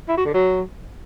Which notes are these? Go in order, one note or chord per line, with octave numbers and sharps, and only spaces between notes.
E4
F#4
D3
F#3